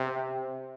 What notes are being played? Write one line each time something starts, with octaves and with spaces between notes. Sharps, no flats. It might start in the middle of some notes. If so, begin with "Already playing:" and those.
Already playing: C3